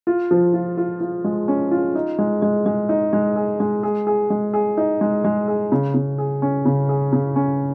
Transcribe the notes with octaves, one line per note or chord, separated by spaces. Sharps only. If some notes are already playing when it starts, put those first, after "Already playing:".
F4
F3
F4
F4
F4
G#3
C#4
F4
D#4
G#3
G#3
G#3
D#4
G#3
G#4
G#3
G#4
G#4
G#3
G#4
D#4
G#3
G#3
G#4
C#3
C#3
G#4
C#4
C#3
G#4
C#3
C#4